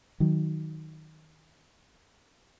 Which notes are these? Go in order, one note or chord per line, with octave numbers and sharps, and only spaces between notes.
D#3 F#3